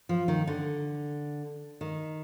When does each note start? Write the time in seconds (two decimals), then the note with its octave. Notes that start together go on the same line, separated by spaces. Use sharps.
0.09 F3
0.28 D#3
0.47 D3
1.81 D#3